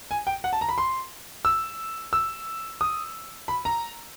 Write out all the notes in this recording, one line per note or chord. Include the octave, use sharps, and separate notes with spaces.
G#5
G5
F#5
A5
A#5
B5
C6
E6
E6
D#6
B5
A#5